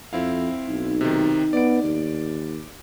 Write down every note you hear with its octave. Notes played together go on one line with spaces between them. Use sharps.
F2 C4 E4 F5
B1 D#4
C3 D#3
B3 D5 D7
D#2